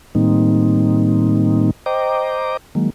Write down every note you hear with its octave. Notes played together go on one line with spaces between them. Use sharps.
A2 D#3 G3 A#3 C4 D#4
C5 D#5 G5 A#5 D6
D#3 F#3 G#3 A#3